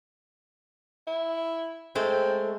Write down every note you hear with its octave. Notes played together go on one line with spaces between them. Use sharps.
E4
G#3 A3 C4